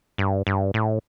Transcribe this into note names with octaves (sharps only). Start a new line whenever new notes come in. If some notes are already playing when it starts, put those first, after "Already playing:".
G2
G2
A2